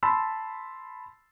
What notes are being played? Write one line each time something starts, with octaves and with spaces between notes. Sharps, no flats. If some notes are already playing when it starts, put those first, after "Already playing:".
A5 B5 C6 E6